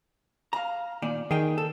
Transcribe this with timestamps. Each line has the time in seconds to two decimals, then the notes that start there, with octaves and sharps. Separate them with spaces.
0.53 F5 A#5
1.02 A#2 D#3 D5
1.31 D#3 G#4 G5
1.58 A4